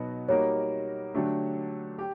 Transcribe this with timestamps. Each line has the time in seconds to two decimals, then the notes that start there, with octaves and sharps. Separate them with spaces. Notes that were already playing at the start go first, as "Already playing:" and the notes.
Already playing: B2 F#3 B3 D#4 F#4
0.29 G3 A#3 D#4 F#4 A#4 C#5
1.14 D3 F#3 A3 D4 G4
1.99 G4